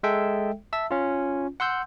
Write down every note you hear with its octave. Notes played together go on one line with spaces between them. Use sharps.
G#3 A4 E5 G5
E5 A5 E6
C#4 F4
F#5 C6 E6 G6